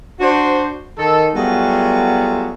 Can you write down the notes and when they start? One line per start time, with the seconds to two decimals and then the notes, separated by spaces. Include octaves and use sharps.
0.20 D4 F#4 C5
0.98 D#3 A4
1.35 F#3 G3 A3 B3 F4 G#4